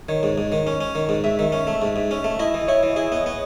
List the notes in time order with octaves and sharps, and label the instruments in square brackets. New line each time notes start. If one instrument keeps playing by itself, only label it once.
[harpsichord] D#3 [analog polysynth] C#5
[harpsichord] G#2
G#2
D#3
C#4
C#4
D#3
G#2
[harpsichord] G#2 [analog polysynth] E5
[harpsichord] D#3
C#4
A3
G#2
G#2
C#4
A3
[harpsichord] E4 [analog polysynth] D#5
[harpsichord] E3
[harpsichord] E4 [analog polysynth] C#5
[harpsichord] E3
[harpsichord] E4 [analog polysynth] G#4
[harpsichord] B3
B3